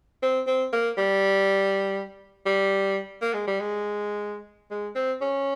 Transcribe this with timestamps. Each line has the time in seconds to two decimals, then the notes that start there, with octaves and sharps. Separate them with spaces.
0.23 C4
0.47 C4
0.73 A#3
0.98 G3
2.46 G3
3.22 A#3
3.34 G#3
3.47 G3
3.60 G#3
4.71 G#3
4.95 C4
5.21 C#4